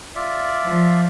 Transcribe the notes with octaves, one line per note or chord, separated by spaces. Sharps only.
F4 D5 E5
F3